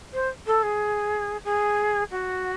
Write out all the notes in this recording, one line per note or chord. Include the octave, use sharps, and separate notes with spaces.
C5
A4
G#4
G#4
F#4